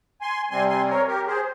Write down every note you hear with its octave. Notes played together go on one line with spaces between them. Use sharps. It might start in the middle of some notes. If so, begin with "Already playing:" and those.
G#5 C6
C3 G3 C4 G#5 C6
G#5 C6
A#4 C#5
G4 A#4
G#4 C5